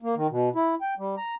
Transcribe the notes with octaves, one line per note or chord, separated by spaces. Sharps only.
A#3
D#3
B2
E4
G5
G3
A#5